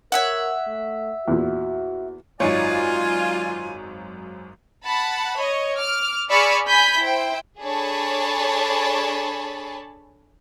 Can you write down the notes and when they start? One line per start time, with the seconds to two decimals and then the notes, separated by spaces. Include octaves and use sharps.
0.12 A#4 C#5 E5 F#5
0.67 A3
1.28 E2 A#2 F#4
2.40 G#1 F#2 D#4 F4 C#5 D5 G#5
4.85 F#5 A5 B5
5.39 C#5 D#5
5.75 D6 F6
6.30 G#4 D5 B5 C#6 E6 F6
6.67 G#5 B5 G6 B6
6.99 E4 C5 G5
7.61 D4 G#4 A4 C#5 A5 B5